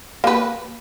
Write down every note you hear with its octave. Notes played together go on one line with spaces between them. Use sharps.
A#3 B4